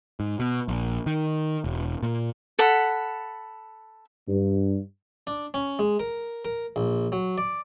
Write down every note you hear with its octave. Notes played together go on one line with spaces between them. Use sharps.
G#2
B2
A#1
D#3
E1
A#2
A4 F#5 B5
G2
D4
C#4
G#3
A#4
A#4
A#1
F#3
D5